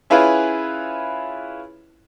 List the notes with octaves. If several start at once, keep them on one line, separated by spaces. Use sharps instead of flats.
C#4 E4 F4 G#4 B4